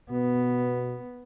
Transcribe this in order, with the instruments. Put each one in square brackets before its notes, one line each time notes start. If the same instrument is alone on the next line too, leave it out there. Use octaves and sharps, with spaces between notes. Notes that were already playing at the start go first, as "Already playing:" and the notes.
[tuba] B2 [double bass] B3